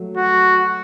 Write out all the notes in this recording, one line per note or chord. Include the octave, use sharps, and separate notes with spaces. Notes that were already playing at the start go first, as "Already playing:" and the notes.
Already playing: F#3 A3
F#4